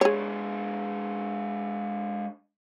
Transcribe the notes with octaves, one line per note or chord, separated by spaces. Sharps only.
G#3 D4 G#4 C#5